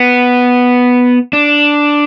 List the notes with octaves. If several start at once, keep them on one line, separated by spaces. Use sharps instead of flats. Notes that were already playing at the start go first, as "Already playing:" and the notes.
Already playing: B3
D4